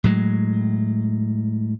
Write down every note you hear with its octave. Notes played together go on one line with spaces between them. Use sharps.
A2 F#3 G#3